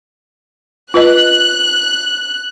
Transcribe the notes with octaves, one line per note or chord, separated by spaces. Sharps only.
F4 B4 D#5 F#6